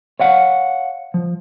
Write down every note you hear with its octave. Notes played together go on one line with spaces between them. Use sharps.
C#5 F5 F#5
F3